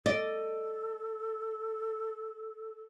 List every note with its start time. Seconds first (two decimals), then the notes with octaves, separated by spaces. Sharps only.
0.06 A4 D5 D#5